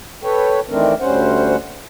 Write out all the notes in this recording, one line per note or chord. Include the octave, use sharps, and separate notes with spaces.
A4 B4 C#5 G5
D#3 E3 A3 C4 D4 A#4
D2 G3 C#4 C5 F#5